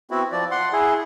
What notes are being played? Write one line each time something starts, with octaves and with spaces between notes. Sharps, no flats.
B3 C4 E4 F#4
F3 D5
F#5 C6
E4 G#4